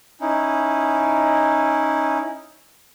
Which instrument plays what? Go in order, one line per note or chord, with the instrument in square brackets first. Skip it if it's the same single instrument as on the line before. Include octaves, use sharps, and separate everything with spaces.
[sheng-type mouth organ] C#4 D#4 E4